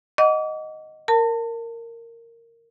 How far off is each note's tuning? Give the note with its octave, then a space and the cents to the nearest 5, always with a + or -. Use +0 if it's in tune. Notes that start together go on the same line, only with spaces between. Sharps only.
D#5 +0 F#5 -5 D6 -40
A#4 -15 A5 +30